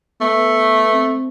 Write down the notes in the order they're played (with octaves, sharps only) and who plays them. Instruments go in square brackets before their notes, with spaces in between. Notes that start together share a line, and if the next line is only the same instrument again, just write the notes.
[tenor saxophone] A3 [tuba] B3
[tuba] C4